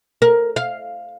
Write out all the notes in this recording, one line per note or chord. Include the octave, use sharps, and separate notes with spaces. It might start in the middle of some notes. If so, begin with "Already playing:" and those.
A#4
F5